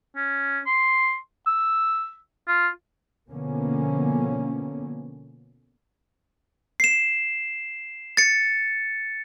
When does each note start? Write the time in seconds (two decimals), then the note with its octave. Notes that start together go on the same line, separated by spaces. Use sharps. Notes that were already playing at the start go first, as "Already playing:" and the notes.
0.16 C#4
0.66 C6
1.47 E6
2.48 F4
3.31 B2 D3 F3 A#3 B3 C#4
6.80 C7 E7
8.17 A6 C#7